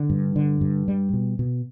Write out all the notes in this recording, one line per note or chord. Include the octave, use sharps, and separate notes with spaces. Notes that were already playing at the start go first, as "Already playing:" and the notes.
Already playing: D3
G2
D3
G2
G3
B2
B2